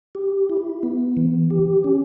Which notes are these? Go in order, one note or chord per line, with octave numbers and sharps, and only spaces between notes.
G4
E4
B3
E3
G4
C#4